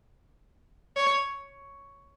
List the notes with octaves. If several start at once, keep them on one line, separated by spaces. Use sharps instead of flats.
C#5